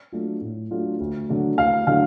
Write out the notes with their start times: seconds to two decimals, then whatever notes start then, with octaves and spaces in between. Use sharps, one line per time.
0.12 F#3 A3 D4 F4
0.41 A2
0.71 F#3 A3 D4 F4
1.00 D2
1.29 D3 F#3 A3 D4
1.58 D2 F5
1.87 D3 F#3 A3 D4 F5